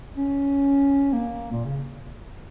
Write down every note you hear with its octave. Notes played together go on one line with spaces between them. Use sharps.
C#4
A#3
A#2
C#3